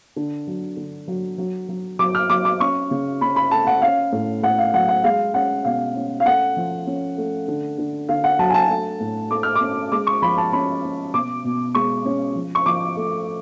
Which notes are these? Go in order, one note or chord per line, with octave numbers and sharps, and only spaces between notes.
D3
F#3
D3
F#3
F#3
F#3
F#3 D6
F6
F#3 D6
D6
C#4 C#6
C#3
C#4 B5
B5
A3 A5
F#5
C#4 F5
A2
A2 F#5
F5
F#3 F#5
F#5
G#3 F5
C#4 F#5
B2 F5
C#4
F5
A3 F#5
F3
C#4
A3
D3
D3
D3 F5
F#5
F#3 A5
G#5
A5
A3
A2
A3 D6
F6
D6
C#4
G#3 D6
C#6
F3 B5
A5
C#4 B5
C#4
B2 D6
B2
G#3 C#6
C#4
F3
C#6
F3 D6
A3